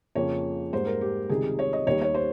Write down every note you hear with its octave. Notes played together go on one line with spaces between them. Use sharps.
F2 C#3 F3 A#3 C#5
G#2 G3 A#3 C5
A#4
G4
C#2 C3 D#3 G3 G#4
C#5
D#5
D#2 D#3 G3 C#5
C#5
C5